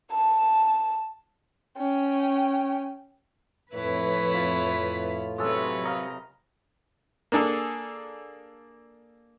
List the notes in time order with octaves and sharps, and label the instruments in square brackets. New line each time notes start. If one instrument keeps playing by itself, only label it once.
[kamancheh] A5
C#4 G5
[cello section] F2 B4 [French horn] A2 [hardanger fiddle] E4 C#5
[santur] F4
[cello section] C3 F#3 [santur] G#3 A4 [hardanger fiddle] B4 C#5
[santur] A#4 D#5 F5
[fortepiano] A#3 D4 G#4 A4